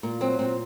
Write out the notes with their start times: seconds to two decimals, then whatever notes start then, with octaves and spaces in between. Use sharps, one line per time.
0.03 A#2 A#3
0.21 F#3 C4
0.39 A#2 C4